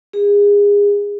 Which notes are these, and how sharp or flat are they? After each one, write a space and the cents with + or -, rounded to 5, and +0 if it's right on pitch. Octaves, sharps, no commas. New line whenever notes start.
G#4 -30